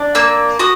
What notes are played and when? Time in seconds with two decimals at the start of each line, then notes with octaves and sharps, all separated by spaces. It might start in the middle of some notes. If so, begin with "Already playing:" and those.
Already playing: D4
0.15 A#3 E6
0.59 F#4 D#6